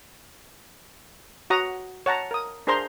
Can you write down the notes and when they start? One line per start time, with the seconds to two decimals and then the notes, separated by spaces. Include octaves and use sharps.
1.50 F#4 C#5 F#5 A#5 D#6
2.06 C#5 F#5 A5 A#5
2.31 A#4 D#6
2.67 D4 G#4 A#4 C5 A#5 C6